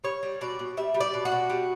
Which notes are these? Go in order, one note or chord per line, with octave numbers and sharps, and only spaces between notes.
G3 C#5
G3
B2 D5
B2
G3 E5
G3
D5
B2
F#4
B2
G3